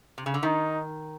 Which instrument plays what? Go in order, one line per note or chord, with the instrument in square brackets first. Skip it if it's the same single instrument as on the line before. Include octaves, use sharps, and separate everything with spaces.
[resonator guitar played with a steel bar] C3
C#3
D3
[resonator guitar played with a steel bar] D#3 [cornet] D#4